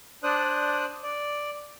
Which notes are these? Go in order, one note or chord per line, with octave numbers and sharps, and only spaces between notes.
D4 C5 D5 D#6 F#6
D5